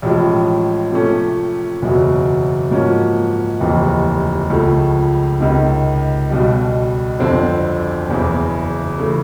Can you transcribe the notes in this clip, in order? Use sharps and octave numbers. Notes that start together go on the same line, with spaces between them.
A1 A2 F3 G#3
C3 F3 A3 C#4
F#1 E2 B2 F#3
G#2 F3 A#3 C#4 F#4
F1 D#2 C#3 E3
C#2 C#3 F3 A3
C#2 C3 D#3
B1 B2 G3
G1 F2 D3 G3 C4
F#1 E2 C#3 E3
C#3 E3 A3